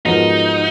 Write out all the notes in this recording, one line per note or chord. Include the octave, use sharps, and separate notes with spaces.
G#2 F3 B3 D#4 F#4 A#4